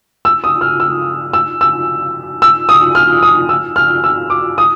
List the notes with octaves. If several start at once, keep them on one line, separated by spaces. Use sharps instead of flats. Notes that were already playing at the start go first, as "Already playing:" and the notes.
E6
D#6
F6
E6
E6
E6
E6
D#6
F6
D#6
E6
F6
E6
D6
D#6